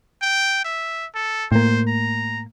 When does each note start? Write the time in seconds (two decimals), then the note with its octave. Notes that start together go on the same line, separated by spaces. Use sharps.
0.22 G5
0.64 E5
1.15 A4
1.52 A2 A#3 C5
1.87 A#5